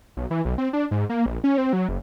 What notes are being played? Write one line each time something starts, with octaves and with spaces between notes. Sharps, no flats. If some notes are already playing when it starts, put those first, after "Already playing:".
B1
E3
B1
C4
D4
G#2
A#3
A#1
C#4
C4
F#3
F#1